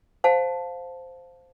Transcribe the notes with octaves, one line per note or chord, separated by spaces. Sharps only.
C5 F5 A5